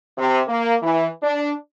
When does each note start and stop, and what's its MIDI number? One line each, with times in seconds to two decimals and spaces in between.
0.17 0.41 48
0.48 0.76 58
0.82 1.07 52
1.22 1.52 62